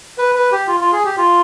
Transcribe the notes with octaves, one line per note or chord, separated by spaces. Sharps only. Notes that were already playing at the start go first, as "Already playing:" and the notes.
B4
B4
G4
F4
F4
G#4
G4
F4